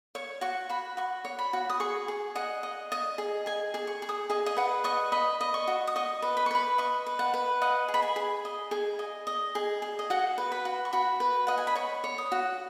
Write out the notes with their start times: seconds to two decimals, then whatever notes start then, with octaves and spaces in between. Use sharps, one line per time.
0.15 C#5 C#6
0.41 F#4 C#6
0.69 F#4 B5
0.97 F#4 C#6
1.25 C#5
1.39 B5
1.53 F#4
1.69 D#6
1.80 G#4 C#6
2.08 G#4
2.35 D#5 F#5
2.63 D#5
2.92 D#5
3.18 G#4
3.46 G#4 G#5
3.74 G#4
3.87 C#6
4.02 G#4
4.09 D#6
4.30 G#4 D#5
4.46 D#5
4.57 B4 F#5
4.84 D#5 C#6
5.12 D#5 B5
5.41 D#5
5.54 C#6
5.67 F#4
5.87 D#6
5.96 D#5 C#6
6.22 B4
6.37 B5
6.46 C#6
6.51 B4 B5
6.78 D#5 C#6
7.06 B4
7.19 F#5
7.34 B4
7.62 D#5 F#5
7.88 G#4
7.94 B5
8.02 G#5
8.16 G#4
8.45 D#5
8.71 G#4
8.99 D#5
9.27 D#5
9.55 G#4
9.82 G#4
9.99 D#5
10.10 F#4 F#5
10.38 B4
10.52 B5
10.65 F#4
10.85 C#6
10.93 F#4 B5
11.20 B4
11.47 D#5 F#5
11.58 G#5
11.67 B5
11.75 C#5 C#6
12.04 C#5
12.18 D#6
12.32 F#4